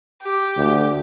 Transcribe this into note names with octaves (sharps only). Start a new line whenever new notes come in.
G4
D2